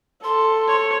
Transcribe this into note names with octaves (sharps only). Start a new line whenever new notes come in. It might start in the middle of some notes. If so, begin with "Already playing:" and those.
A4 C6
C#5